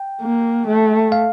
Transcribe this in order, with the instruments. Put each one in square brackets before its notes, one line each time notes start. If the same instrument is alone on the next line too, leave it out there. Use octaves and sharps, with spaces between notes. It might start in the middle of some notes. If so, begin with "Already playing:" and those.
Already playing: [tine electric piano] G5
[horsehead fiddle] A#3
A3
[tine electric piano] F5